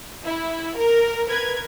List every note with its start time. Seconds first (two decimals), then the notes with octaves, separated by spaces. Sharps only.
0.24 E4
0.76 A#4
1.27 A#4 B4 G#6